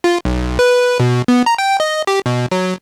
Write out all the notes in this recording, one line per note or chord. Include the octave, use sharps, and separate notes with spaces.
F4
B1
B4
B2
B3
A#5
G5
D#5
G4
B2
F#3